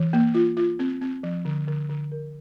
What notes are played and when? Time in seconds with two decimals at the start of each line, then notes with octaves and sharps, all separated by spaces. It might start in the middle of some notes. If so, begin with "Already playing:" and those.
Already playing: E3
0.13 A#3
0.35 F4
0.57 F4
0.79 C4
1.01 C4
1.23 F3
1.45 D3
1.67 D3
1.89 D3
2.12 A#4